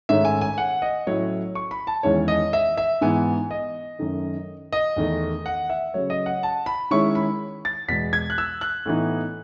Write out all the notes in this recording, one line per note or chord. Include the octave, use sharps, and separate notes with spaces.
G#2 D#3 A3 C#4 E5
G#5
G#5
F#5
D#5
A2 F#3 C#4 E4 C#5
C#6
B5
A5
E2 D#3 G#3 C#4 E4 C#5
D#5
E5
E5
G#2 E3 B3 G#5
D#5
F#2 D#3 A3
D#5
E2 D#3 A3
F#5
E5
C#3 F#3 A3 C#5
D#5
F#5
A5
B5
D#3 G#3 C#4 E4 C#6
B5
A6
E2 B2 G#3 B3 B6
G#6
F#6
E6
F#6
A2 E3 B3 D#4